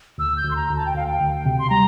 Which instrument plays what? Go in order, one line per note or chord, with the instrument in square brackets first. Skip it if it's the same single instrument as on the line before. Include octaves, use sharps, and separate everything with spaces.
[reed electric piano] D2 [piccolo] E6
[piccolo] G6
[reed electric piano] D2
[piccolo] C6
A#5
[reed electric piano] D2
[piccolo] A5
G5
[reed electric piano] D2 [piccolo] F5
[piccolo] G5
[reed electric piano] D2
C3
[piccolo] C6
[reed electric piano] G3 [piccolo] A#5